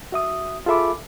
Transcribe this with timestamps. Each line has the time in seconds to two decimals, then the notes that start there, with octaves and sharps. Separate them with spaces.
0.12 F#4 E5 D#6
0.66 F4 G#4 A4 E5 B5 D6